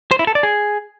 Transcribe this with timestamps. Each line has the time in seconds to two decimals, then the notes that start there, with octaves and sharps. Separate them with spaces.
0.11 C5
0.19 E4
0.27 A4
0.35 D5
0.43 G#4